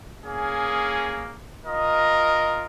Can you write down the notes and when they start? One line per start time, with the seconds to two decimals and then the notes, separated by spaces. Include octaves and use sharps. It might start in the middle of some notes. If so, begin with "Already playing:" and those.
0.25 A#3 C#4 G#4
1.64 F4 A#4 D#5